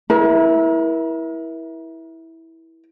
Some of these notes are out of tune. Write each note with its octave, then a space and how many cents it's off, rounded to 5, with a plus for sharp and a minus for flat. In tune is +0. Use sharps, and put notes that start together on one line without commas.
E4 -10 A#4 +40